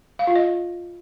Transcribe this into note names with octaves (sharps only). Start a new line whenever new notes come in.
F5
F4
D#5